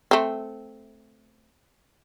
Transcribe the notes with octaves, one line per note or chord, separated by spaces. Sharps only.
A3 C4